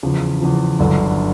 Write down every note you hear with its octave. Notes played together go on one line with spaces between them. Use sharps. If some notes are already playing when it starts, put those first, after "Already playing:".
E2 C#3 F3
E2 C#3 F3
G1 F#2 D3